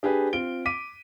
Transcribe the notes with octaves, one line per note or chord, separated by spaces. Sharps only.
D4 G4 G#4 B4
C4 F4 D7 G7
D6 B6 D#7